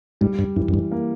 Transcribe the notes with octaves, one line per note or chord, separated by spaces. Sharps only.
G#2 G3
G2
F#2 E3
F#2
G2
A#3